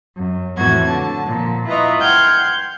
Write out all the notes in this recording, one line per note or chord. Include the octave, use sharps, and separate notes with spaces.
F#2
F2 A2 E3 F#4 G#6
D3 A5
A#2 F3
E4 F4 B4 D#5 A#5 C#6
F#5 G5 C6 F6 G6 G#6